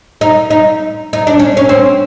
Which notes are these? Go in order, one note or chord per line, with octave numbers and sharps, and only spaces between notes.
D#4
D#4
D#4
D4
C#4
C#4
C4